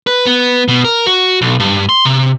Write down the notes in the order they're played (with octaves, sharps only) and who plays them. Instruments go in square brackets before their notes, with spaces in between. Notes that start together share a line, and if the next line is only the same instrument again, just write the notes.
[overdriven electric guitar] B4
B3
B2
A#4
F#4
B1
G2
C6
C3